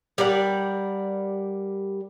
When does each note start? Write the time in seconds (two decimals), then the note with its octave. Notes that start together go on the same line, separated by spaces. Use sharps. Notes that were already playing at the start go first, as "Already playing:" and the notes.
0.18 G3 A#4 D5 F#5